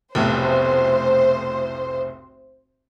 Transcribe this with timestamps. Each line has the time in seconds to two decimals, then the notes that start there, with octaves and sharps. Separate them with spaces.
0.15 F1 B1 A2 C5